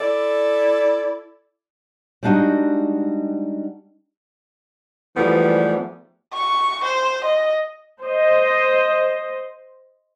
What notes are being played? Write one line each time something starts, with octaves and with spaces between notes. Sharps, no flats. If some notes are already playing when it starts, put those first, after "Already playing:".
E4 A4 D5
G3 G#3 D4 D#4 F#4
G#2 E3 F3 G3 A3 B3
C#6
C5
D#5
C5 D#5